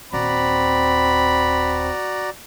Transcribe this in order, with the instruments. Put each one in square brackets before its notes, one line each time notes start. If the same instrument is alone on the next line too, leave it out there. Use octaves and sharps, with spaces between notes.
[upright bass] D#1 [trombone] C4 [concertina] F#4 D5 A#5 [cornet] B5